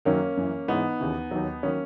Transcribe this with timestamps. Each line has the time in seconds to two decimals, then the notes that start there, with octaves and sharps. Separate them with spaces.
0.05 F#2 D#3 F#3 A#3 C#4
0.37 F#2 E3
0.68 G#2 E3 B3 D#4
1.00 D#2 C#3 E3
1.31 D#2 D#3 F#3
1.63 D#3 F#3 A#3 C#4